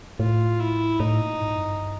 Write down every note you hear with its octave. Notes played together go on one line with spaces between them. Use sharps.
A2 F4
E4
A2 D#4
A#2
G#2
F#2
G2